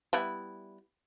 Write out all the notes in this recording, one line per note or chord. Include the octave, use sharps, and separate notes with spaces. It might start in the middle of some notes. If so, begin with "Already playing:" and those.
G3 B3 E4